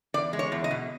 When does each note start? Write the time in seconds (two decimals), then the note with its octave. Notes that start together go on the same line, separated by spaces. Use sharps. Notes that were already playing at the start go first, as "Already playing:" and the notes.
0.14 E2 D5
0.33 G#3
0.39 C#5
0.52 E2
0.64 D#5
0.71 B2